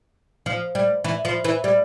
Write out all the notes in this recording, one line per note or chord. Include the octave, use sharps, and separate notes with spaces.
F3
G3
E3
F3
E3
G3